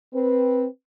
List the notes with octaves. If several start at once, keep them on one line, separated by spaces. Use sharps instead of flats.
C4 B4